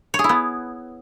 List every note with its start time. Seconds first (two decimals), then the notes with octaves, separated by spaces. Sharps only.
0.14 C#5
0.19 G#4
0.24 E4
0.29 B3